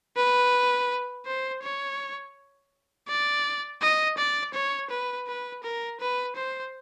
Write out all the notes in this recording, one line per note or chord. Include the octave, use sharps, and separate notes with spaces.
B4
C5
C#5
D5
D#5
D5
C#5
B4
B4
A#4
B4
C5